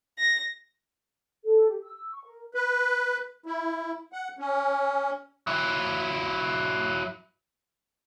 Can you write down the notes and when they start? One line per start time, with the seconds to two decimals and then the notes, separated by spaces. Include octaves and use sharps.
0.19 A#6
1.44 A4
1.69 G4
1.83 E6
2.12 C#6
2.26 A#4
2.54 B4
3.46 E4
4.13 F#5
4.39 C#4
5.47 F#3 E4